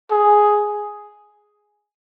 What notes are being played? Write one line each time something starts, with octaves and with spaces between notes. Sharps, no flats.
G#4